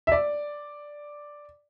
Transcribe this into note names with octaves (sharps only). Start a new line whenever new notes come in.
E5
D5